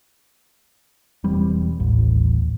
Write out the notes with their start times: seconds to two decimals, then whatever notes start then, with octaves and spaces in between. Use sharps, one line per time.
1.24 E1 E3 G3 C4
1.80 A1 D#2